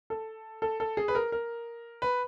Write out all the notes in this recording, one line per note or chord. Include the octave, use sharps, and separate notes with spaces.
A4
A4
A4
G#4
B4
A#4
A#4
B4